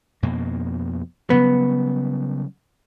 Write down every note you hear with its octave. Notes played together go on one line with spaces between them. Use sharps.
F2 B2 A#3
C#3 F#3 G3 B3